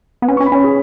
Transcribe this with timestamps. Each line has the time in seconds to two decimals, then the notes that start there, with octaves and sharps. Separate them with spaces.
0.22 B3
0.28 C#4 B4
0.37 C#6
0.40 C#4
0.46 B5
0.52 C#4 C#5
0.64 G#4